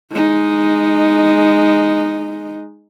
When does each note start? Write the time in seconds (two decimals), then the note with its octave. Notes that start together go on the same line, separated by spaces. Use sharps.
0.11 G#3 D#4